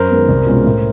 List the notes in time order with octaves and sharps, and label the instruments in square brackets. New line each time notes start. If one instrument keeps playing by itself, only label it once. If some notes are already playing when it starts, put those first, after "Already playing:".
Already playing: [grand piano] F#2 [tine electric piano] A#4 C5
[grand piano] D#3 G#3 B3
C2
B2 G#3 C#4 F4
A2